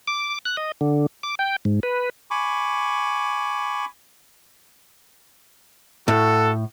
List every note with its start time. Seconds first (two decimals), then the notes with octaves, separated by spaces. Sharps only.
0.08 D6
0.45 F#6
0.57 D#5
0.81 D3
1.23 D6
1.39 G5
1.65 G#2
1.83 B4
2.31 G#5 B5 C#6 D6
6.08 A2 F#4 A4